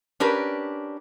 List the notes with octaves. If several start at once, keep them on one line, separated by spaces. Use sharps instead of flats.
C#4 D4 G4 A#4 B4